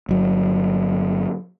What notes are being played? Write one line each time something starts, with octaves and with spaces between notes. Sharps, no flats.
G1 F#3